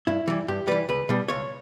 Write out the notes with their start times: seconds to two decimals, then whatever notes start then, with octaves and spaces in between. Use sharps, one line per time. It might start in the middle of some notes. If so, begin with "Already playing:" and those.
0.07 G2 E4
0.28 E3 G3
0.48 G2 G4
0.68 E3 G3 B4
0.89 C#2 B4
1.09 B2 G3
1.28 C#2 C#5